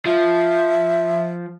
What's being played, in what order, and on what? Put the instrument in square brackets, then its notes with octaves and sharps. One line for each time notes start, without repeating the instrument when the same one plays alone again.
[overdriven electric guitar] F3 [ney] E5